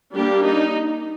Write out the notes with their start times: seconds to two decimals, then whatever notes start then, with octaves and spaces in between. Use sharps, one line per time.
0.14 G3 A#3 D4 G4
0.45 D#4